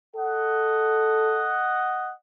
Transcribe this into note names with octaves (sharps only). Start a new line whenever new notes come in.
A4 D#5 F#5